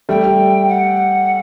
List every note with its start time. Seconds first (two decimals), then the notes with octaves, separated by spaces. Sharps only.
0.09 G3 A3 G5
0.68 F#5